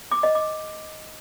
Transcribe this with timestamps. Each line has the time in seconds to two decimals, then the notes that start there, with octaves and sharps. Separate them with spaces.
0.11 D6
0.23 D#5
0.35 D6